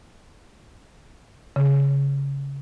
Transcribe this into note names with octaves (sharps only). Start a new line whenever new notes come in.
C#3